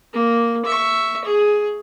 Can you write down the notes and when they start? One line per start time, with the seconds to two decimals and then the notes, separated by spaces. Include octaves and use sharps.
0.13 A#3
0.65 E5 C#6
1.25 G#4